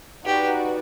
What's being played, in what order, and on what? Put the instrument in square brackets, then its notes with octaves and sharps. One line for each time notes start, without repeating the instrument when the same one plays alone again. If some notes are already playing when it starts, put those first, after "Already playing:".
[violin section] D#4 F#4 B4 D5 [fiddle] G4